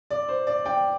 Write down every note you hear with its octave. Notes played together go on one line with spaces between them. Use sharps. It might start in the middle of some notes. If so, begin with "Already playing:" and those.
D5
C5
D5
D5 G5